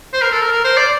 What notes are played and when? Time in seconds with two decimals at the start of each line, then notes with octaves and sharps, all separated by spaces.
0.13 C5
0.22 A#4
0.32 A4
0.42 A#4
0.52 A#4
0.65 C5
0.77 D5